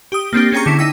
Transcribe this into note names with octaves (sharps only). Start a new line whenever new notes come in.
G4 D#6
A#3 C4 D4 G4
C#4 G#4 G5 A#5 C#6
D3 E4 C#6
D#4 E5 G5 E6